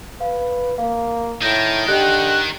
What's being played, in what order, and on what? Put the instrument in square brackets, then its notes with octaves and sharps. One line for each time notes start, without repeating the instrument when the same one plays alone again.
[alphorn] B4 [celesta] F5
[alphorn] A#3 [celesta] F5
[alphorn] A2 [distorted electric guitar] D#3 [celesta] G6 A#6
[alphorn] D3 [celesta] G4 D#5 G5 [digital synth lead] F#6